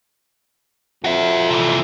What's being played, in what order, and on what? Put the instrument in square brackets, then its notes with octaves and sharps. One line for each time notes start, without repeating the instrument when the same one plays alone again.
[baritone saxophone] F2 [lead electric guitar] F#4 E5
[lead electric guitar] C3 E3